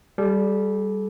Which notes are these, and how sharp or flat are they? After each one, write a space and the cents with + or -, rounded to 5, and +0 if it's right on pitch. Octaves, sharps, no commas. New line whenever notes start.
G3 +0 A4 -40